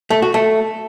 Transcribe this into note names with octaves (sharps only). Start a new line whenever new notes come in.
A3
F#4
A3